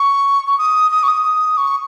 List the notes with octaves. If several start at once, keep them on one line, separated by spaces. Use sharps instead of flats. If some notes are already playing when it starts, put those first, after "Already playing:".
Already playing: C#6
C#6
D#6
D#6
C#6
D#6
C#6